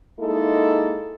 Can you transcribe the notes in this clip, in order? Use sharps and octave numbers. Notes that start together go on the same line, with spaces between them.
G#3 A#3 D#4 E4 A4